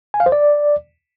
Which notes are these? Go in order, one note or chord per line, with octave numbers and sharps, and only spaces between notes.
G#5
F5
C5
D5